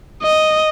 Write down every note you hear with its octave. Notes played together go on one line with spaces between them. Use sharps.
D#5